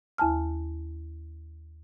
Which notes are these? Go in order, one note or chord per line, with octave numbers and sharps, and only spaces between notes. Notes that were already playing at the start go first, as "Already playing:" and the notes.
D#2 E4 G#5 A5 F6